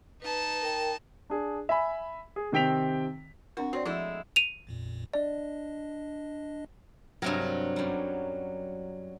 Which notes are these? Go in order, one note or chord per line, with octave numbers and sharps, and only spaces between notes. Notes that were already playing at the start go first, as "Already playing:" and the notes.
D#4 B4 A5
A#4 G5
D4 G#4
E5 G#5 B5
G#4
C3 D#3 C4 G5 B6 F7
C4 D4 F#4 A#4
C4 F#4 C#5 D5
F3 G#3 A3 E4
D#7 F7
A1 F2 A#2
D4 D5 D#5
G2 C3 F#3 A#4
F#2 G3